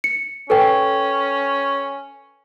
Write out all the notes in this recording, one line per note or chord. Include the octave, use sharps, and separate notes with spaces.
C#7
C#4 A4 B4 G5